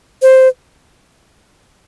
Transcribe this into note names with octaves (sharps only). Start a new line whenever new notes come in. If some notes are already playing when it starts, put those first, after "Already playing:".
C5